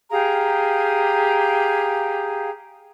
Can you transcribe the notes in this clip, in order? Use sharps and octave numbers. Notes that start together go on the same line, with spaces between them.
G4 G#4 F5 A#5